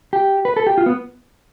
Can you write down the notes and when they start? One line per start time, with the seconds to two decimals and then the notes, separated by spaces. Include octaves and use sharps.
0.13 G4
0.45 B4
0.56 A4
0.67 G4
0.78 F4
0.86 B3